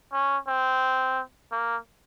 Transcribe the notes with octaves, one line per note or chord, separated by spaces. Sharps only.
C#4
C4
A#3